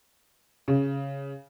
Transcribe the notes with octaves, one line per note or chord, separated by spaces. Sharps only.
C#3